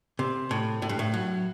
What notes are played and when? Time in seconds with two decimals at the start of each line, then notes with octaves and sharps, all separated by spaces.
0.19 C3
0.51 A2
0.82 A2
0.89 G2
0.99 A2
1.14 F#3